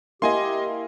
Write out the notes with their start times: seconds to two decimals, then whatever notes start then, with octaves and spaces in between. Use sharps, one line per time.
0.22 A#3 E4 G4 D#5 G#5 C6